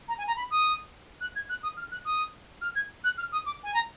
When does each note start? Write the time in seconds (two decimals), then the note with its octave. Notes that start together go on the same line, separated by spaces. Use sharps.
0.08 A#5
0.18 G#5
0.27 A#5
0.37 B5
0.51 D#6
1.21 F#6
1.35 G#6
1.49 F#6
1.63 D#6
1.77 F6
1.92 F#6
2.05 D#6
2.62 F6
2.75 G#6
3.04 F#6
3.18 F6
3.32 D#6
3.46 D6
3.64 G#5
3.74 A#5